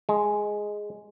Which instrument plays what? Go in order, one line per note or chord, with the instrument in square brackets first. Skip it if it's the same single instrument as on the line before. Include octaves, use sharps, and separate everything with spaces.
[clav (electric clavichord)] G#3